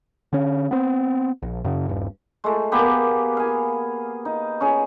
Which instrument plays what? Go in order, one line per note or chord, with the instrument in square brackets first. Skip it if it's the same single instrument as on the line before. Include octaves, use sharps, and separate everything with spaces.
[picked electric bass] D3 C#4
B3 C4
A#1
F#2 C#3
D#1 G2
[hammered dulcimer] G#3 A3
A#3 B3 G4 G#4
F5 G#5
D#4
C#4 G#4